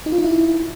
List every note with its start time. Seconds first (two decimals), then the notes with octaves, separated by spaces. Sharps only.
0.06 D#4
0.12 F4
0.18 D#4
0.24 E4